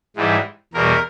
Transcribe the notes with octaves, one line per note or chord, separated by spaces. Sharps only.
G#2 E3 G3
E2 B2 G3 A#4